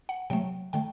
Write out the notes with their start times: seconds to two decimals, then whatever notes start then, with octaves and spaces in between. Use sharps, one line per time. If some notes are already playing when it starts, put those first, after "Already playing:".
0.09 F#5
0.30 C3 F#3 A3 G5
0.73 D3 A3 G5